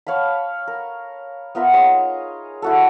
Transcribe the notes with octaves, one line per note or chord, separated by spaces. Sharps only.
C#5 F5 A5 B5
A#4
B3 F4 A#4 E5
D#4 G#4 C#5 C6
E4 F#4 A4